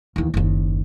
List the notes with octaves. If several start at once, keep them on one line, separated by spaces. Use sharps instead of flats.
D#2 E3
F#1 D#2